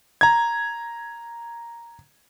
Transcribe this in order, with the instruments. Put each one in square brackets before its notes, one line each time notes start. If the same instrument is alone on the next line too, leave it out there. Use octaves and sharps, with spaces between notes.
[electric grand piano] A#5 G#6